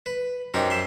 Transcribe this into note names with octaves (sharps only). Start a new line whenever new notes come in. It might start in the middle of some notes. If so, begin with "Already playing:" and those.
B4
F#2 D#4 G4 A#4 C5 G5
E5 C6